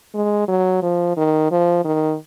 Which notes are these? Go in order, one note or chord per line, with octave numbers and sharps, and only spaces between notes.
G#3
F#3
F3
D#3
F3
D#3